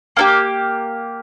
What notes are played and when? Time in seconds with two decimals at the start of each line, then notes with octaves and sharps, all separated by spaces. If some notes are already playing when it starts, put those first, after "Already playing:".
0.17 A#3 D4 G4